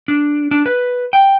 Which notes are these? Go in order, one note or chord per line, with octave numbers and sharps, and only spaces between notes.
D4
D4
B4
G5